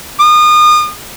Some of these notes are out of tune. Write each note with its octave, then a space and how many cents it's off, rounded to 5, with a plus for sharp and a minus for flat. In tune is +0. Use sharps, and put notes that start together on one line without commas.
D#6 -35